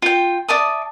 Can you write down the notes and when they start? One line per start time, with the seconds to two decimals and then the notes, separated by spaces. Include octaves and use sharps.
0.02 F4 G5
0.48 D5 E5 A5 D#6